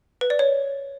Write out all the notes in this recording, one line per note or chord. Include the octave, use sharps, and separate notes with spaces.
B4
D5
C#5